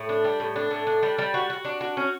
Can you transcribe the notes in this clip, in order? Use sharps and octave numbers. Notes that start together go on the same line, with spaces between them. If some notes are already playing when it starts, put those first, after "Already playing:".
Already playing: A2
D4
G3
A2
D4
A2
D4
G3
G3
F#4
F#4
D4
F#4
C#4